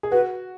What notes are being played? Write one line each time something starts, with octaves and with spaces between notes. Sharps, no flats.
G#4
F#4 B4